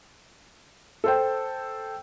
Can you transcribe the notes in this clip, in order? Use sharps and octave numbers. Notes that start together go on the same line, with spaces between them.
A4 C5 G5